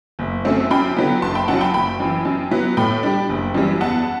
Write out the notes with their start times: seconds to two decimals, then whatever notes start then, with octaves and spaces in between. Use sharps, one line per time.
0.19 F#1
0.45 F#2 D3 A3 C4
0.71 F#2 G5 B5
0.96 D3 F#3 B3
1.22 F#1 A5 C6
1.35 G5 B5
1.48 F#2 F#3 F#5 A5
1.61 G5 B5
1.74 F#1 G5 B5
2.00 F#2 E3
2.25 F#2
2.51 F#3 B3
2.77 A2 G5 B5
3.03 G3 D4
3.29 F#1
3.55 F#2 E3 G3
3.80 E2 F#5 A5